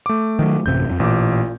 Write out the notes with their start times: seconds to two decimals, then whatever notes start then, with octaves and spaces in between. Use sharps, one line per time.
0.06 A3 D6
0.39 D#3 E3 F#3
0.66 A1 F#2 C3 G6
0.87 E1 F2
1.00 A1 A#2 D6